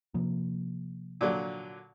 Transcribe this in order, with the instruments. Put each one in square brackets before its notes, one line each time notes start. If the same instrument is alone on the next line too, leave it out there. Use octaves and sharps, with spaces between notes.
[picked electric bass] C3 F3 A#3
[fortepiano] A#2 D3 F#3